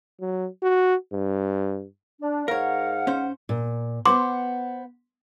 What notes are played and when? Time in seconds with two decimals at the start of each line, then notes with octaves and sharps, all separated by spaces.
0.21 F#3
0.63 F#4
1.13 G2
2.21 D4
2.48 G#2 A#4 C#5 F5 F#5
3.07 C#4 C5
3.49 A#2
4.05 B3 C5 F#5 C6 D6